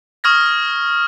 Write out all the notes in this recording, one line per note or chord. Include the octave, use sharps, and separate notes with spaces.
C#6 D#6 F6 G#6 A#6